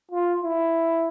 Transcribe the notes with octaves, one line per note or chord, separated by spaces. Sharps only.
F4
E4